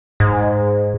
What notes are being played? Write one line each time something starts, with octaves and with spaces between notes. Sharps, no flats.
G#2